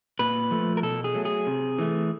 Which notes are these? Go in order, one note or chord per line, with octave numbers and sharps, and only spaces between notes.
A#2 B4
F3 A3
A#4
B2 A4
G#4
F#3 A3
G#4
C3
E3 A3